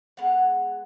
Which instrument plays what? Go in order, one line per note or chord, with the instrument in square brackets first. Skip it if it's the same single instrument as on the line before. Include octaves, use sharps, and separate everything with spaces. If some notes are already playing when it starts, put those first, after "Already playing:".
[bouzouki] G#3 B3 F5 F#5